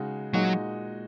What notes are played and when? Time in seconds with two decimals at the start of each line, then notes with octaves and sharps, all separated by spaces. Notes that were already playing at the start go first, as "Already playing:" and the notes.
Already playing: C#3 G#3 D#4 F#4
0.33 A#2 F#3 G#3 D#4 F#4